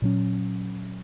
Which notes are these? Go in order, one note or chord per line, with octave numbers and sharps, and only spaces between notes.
A#2 F#3 C#4